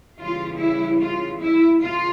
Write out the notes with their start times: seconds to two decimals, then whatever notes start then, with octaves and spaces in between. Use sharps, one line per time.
0.19 C#3 E3 G3 F4
0.60 E4
1.01 F4
1.41 E4
1.81 C#3 F4